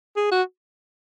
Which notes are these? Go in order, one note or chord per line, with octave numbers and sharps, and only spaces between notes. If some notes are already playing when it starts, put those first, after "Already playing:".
G#4
F#4